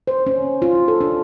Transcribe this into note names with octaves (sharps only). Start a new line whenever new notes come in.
C5
C#4
F4
A4
D4